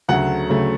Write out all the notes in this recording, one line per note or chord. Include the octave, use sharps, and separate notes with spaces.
D2 C#3 F#3 A3 F#5
D2 C#3 F#3 A3